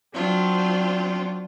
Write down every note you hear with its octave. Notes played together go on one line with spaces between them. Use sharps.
F#3 C4 D4 F4